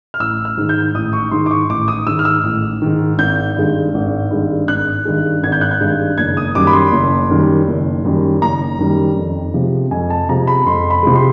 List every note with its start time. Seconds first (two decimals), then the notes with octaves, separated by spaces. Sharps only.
0.14 F6
0.20 A1 E6
0.45 F6
0.57 G#2 D#3
0.69 G6
0.95 A1 D#6
1.13 C#6
1.31 G#2 D#3 C6
1.46 D6
1.51 C#6
1.70 A1 D6
1.88 D#6
2.06 G#2 D#3 E6
2.19 F6
2.25 E6
2.44 A1
2.82 G#2 D#3
3.18 G#1 G6
3.56 G2 D#3 G#3
3.94 G#1
4.31 G2 D#3 G#3
4.68 G#1 F#6
5.05 G2 D#3 G#3
5.43 G#1 G#6
5.52 G6
5.61 F#6
5.71 G6
5.81 G2 D#3 G#3
6.18 F#1 G#6
6.37 D#6
6.55 F#2 D#3 G3 D6
6.67 B5
6.73 C6
6.92 F#1
7.30 F#2 D#3 G3
7.67 F#1
8.04 F#2 D#3 G3
8.42 F#1 A#5
8.79 F#2 D#3 G3
9.17 F2
9.54 C3 F3 G#3
9.91 F2 G#5
10.10 A5
10.29 C3 F3 G#3 A#5
10.47 B5
10.66 F2 C6
10.90 B5
11.03 C3 F3 G#3
11.16 C6